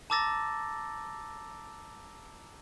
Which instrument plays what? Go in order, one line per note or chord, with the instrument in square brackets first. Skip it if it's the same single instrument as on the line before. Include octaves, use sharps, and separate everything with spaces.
[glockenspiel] A5 A#5 D6 E6 A6 A#6